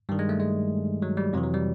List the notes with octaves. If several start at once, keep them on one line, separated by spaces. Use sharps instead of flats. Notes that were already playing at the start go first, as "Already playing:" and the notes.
G2 D#3 G3
G#3
A3
G#3
F#3
G3
F2 C3 E3 F#3
F#3
G3